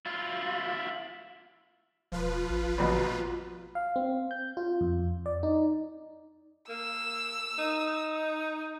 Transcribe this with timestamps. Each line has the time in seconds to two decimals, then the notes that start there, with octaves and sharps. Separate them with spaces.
0.06 E4 F4
2.12 E1 F3 F4 B4
2.50 A1
2.78 A#1 F2 B2
3.75 F5
3.96 C4
4.31 G6
4.57 F4
4.81 F2
5.26 D5
5.43 D#4
6.69 A#3 E6
7.58 D#4